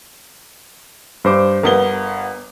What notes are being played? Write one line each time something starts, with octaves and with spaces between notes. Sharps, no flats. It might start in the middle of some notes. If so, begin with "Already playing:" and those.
G2 C5 D6
G1 B3 A#4 G7